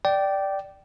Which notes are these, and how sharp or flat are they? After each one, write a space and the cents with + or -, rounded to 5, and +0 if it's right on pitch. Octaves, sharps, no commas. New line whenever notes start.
D5 +0 G5 -15